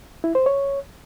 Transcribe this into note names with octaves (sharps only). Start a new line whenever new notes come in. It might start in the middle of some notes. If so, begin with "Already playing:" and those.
E4
C5
C#5